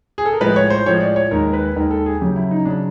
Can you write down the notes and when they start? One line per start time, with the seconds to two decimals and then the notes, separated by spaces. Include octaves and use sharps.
0.18 G#4
0.26 A4
0.33 A#4
0.41 A2 F3 G#3 B4
0.56 C#5
0.70 C5
0.86 A2 F3 G#3 C#5
1.01 D5
1.16 C#5
1.31 D#2 D#3 G#3 A#4
1.53 B4
1.76 D#2 D#3 G#3 A#4
1.91 A4
2.06 G#4
2.21 F#2 C#3 F#3 G4
2.36 E4
2.51 D#4
2.65 C#3 F#3 D4